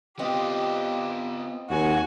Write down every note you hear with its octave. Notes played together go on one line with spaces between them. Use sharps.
B3 C4 F4 G4 D#5 F5
D#2 F#4 G#5